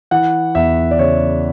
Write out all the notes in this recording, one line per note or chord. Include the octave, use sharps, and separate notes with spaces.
E3 F#5
E2 E5
D5
C#3 C#5